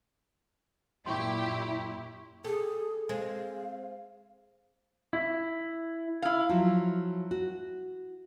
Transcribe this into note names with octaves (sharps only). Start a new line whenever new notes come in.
F#2 A#2 E4 G4 C6 C#6
G3 G#4 A4
G#3 C4 F5
E4
E4 F5
F3 F#3
F#4